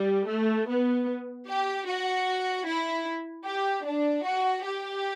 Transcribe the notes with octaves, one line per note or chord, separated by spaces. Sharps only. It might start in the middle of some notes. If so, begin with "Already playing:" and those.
Already playing: G3
A3
B3
G4
F#4
E4
G4
D4
F#4
G4